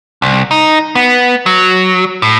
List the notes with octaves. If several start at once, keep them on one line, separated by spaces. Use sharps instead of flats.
C2
D#4
B3
F#3
A2